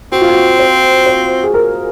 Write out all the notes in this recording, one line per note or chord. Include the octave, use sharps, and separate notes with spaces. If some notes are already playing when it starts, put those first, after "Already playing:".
C4 F#4
F4
F#4
C5
C5
G#4
A#4